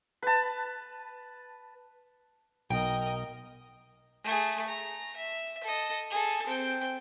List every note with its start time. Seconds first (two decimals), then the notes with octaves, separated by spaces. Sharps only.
0.22 B4 A5
2.70 B1 A#4 D#5 G5
4.24 A3 G#4
4.68 A#5
5.16 E5
5.64 A4 D#5
6.10 G#4 A4
6.47 C4 G5